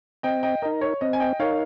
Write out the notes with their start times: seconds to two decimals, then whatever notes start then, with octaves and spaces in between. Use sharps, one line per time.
0.23 C4 D#5 G5
0.43 D#5 G5
0.62 D#4 A#4 D#5
0.81 C#5
1.01 C4 D#5
1.13 G#5
1.20 D#5 G5
1.40 D#4 A#4 C#5 F5